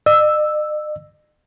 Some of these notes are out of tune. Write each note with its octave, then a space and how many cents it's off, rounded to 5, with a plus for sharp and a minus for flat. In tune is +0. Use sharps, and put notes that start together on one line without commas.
D#5 -45 E6 +0